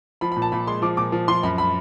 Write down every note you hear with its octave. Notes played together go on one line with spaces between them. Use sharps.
F3 B5
B5
A#2
A5
A#2 B5
G#3 C6
F3 D6
A#2 D6
F3
F3 C6
F#2 B5
B5